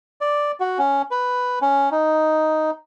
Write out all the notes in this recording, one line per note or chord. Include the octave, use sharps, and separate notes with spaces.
D5
F#4
C#4
B4
C#4
D#4